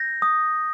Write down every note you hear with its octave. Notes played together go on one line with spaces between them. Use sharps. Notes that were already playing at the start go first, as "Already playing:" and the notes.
Already playing: G6 A#6
D#6